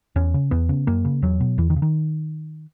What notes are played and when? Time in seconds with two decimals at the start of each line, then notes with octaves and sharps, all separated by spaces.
0.16 E2 C#4
0.34 C#3
0.51 E2 B3
0.69 C#3
0.87 F#2 A#3
1.05 C#3
1.22 E2 F#3
1.40 B2
1.58 E2 E3
1.70 D#3
1.76 C#3
1.82 D#3